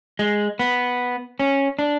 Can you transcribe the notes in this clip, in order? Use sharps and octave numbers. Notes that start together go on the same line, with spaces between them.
G#3
B3
C#4
D4